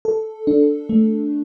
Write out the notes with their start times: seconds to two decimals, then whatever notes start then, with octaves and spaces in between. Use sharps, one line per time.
0.05 A4
0.47 D4
0.89 A3